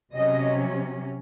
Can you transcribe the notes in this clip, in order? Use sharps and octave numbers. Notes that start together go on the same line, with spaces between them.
C3 F#3 C#4 D#5